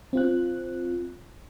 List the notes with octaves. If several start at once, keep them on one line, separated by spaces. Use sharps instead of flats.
C4 F4 F#6